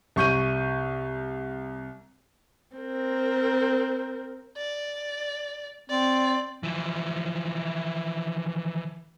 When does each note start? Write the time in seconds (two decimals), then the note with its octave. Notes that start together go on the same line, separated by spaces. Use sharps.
0.16 C2 C#6 G6 D#7
2.77 C4 A#4
4.58 D5
5.90 C4 D5
6.63 E3 F3